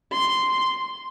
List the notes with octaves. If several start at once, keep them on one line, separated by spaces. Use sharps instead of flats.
C6